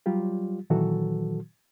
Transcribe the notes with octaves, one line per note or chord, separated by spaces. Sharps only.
F#3 G3 F4 G4
A#2 D#3 E3 F#3 F#4 A4